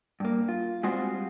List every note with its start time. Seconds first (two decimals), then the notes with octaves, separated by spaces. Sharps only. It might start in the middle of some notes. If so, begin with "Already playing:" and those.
0.20 G2 A#3
0.48 F4
0.83 G3 G#3 C4 F4 F#4 C5